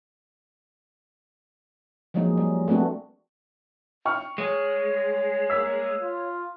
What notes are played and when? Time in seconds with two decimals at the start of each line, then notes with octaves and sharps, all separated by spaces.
2.14 F3 F#3 G#3 A#3 D#4
2.37 G3
2.68 A3 B3 C4 D4 F#4
4.05 G5 C#6 F6
4.38 G#3 C#5
5.50 A#3 E6 B6
6.02 F4